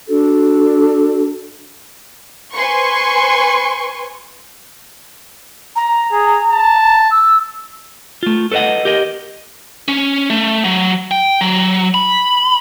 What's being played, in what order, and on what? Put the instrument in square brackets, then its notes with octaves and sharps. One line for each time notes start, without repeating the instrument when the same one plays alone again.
[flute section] D4 F#4 A4
[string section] B4 C5 G#5 C6 C#6
[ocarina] A#5
[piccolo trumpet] G#4
A5
[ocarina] E6
[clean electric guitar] A3 F4
A4 B4 C5 D#5 F#5
G4 A#4 D#5
[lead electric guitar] C#4
A3
F#3
G5
F#3
B5